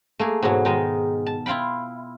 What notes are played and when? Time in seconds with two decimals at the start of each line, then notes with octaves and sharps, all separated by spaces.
0.19 A3 A#3 G#4
0.42 G#2 B2 E3 F#3
0.65 D#3 G#3 D#4
1.26 A5
1.46 E4 F4 F5 G5 B5